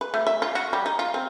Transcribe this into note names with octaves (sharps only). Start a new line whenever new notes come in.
B4
A3
E5
F4
F#4
G3
D#4
F4
C4